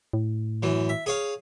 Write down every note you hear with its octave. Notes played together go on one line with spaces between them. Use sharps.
A2
F#2 E3
E5
G#4 C#5 F5